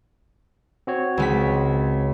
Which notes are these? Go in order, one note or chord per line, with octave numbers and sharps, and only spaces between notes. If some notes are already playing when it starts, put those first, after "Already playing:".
C4 F#4 C#5
C#2 G#3 B6